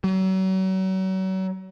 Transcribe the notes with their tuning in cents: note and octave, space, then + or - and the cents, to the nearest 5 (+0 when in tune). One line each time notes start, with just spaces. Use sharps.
F#3 +35